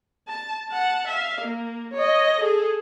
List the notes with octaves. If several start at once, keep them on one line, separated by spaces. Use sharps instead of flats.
A5
F#5 A5
E5 F5
A#3
C#5 D#5
G#4 A4